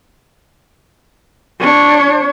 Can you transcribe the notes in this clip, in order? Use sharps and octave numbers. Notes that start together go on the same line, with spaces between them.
D4 C#5